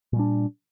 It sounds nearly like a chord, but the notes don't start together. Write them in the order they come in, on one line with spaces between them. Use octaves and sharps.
A#2 G3 D4